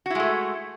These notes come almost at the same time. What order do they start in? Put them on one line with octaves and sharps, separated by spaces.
F#4 E4 G#3 A3